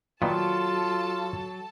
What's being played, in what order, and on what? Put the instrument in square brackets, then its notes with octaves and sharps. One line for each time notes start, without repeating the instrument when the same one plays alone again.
[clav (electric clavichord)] A#2 D#3 B3 [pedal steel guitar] F#3 [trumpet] F4 [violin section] A4 A5